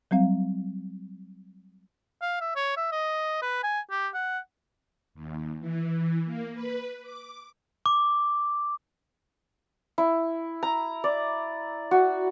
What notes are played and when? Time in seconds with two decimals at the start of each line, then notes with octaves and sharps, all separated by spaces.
0.11 F#3 G3 C4 F5
2.22 F5
2.41 E5
2.56 C#5
2.77 E5
2.92 D#5
3.42 B4
3.63 G#5
3.91 G4
4.15 F#5
5.14 D#2
5.60 E3
6.25 A#3
6.53 B4
7.02 D6
7.86 D6
9.98 E4
10.63 A#5
11.04 D5
11.91 F#4